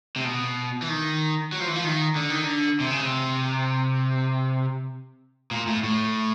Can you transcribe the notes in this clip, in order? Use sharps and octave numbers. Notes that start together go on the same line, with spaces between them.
C3
B2
E3
D#3
F#3
F3
E3
F3
D#3
D3
D#3
D3
C3
C#3
C3
A#2
A2
A2